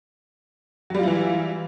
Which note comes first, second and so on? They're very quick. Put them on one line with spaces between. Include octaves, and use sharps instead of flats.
F#3 G3 F4 E4 E3